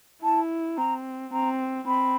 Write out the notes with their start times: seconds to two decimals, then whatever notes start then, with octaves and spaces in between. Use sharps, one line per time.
0.23 E4 A5
0.78 C4 A#5
1.33 C4 A#5
1.87 C4 B5